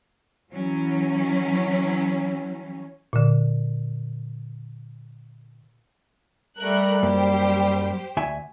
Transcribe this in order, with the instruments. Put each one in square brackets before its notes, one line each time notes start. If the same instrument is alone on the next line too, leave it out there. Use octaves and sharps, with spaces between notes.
[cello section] E3 F#3 C#4
[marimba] A#2 D3
[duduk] G3 [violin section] A3 A#4 F#6
[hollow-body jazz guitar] F#2 A#3 [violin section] G4 C5
[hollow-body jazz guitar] D2 E5 G#5